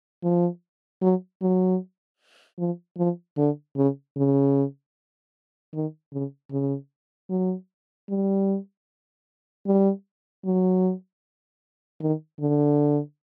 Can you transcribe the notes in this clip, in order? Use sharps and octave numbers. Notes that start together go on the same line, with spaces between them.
F3
F#3
F#3
F3
F3
D3
C#3
C#3
D#3
C#3
C#3
F#3
G3
G3
F#3
D#3
D3